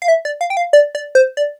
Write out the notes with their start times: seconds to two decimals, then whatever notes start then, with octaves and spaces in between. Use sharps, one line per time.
0.02 F5
0.08 E5
0.25 D5
0.41 F5
0.50 G5
0.57 F5
0.73 D5
0.95 D5
1.15 C5
1.37 D5